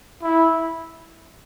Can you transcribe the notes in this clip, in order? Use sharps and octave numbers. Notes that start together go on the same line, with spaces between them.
E4